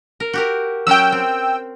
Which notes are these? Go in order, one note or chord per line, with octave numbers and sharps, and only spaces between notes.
A#4
F#4 G4 A#4
F#3 C#4 A#4 G5 E6
C4